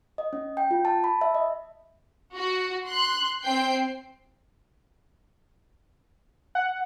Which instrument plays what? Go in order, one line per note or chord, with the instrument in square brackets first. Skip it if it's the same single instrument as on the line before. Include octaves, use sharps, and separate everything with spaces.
[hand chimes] D#5
C#4
G5
F4
A5
B5
E5
D#5
[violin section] F#4
C6 F#6
C4 G5 G6 C7
[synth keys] F#5